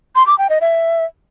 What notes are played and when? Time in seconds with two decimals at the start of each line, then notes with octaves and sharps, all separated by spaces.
0.15 C6
0.27 D6
0.38 G5
0.50 D#5
0.61 E5